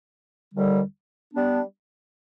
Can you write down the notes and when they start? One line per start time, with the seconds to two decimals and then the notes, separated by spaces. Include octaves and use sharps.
0.53 D#2 D3 G3
1.33 G3 B3 D4